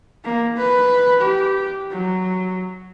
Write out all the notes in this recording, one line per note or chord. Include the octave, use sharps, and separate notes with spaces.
A#3
B4
G4
F#3